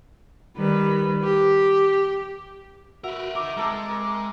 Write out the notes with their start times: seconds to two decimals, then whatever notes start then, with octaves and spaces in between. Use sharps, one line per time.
0.57 D#3 G3 B4
1.24 G4
3.04 F#4 A#4 B4 E5
3.35 D#4 A#4 D6
3.57 G#3 C4 A4 A#4
3.88 A#4